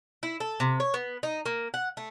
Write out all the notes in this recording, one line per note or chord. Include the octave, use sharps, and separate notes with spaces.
E4
A4
C3
C#5
B3
D#4
A#3
F#5
A3